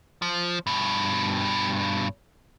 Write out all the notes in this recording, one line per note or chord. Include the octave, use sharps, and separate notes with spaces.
F3
G2 B2